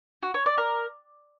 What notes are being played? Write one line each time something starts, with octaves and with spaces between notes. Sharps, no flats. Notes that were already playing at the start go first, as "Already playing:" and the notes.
F#4
C#5
D5
A#4